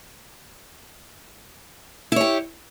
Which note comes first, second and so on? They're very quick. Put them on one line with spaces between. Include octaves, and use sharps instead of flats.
E4 C#5 G4